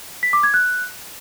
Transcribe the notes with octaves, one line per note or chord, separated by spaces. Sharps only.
B6
D6
G#6
F#6